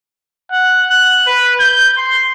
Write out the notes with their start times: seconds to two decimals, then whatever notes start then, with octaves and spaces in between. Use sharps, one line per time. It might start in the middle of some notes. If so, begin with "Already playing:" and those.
0.51 F#5
0.90 F#6
1.27 B4
1.59 G6
1.97 C6